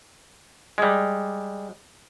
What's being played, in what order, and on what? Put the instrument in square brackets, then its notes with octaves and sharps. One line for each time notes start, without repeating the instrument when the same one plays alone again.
[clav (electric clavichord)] G3 G#3